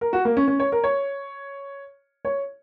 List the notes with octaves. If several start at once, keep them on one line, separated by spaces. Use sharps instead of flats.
A#4
F#4
A#3
C#4
C#4
C#5
A#4
C#5
C#5